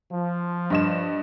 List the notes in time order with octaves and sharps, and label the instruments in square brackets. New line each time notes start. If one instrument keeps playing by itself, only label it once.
[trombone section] F3
[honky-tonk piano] G2 D#5 E7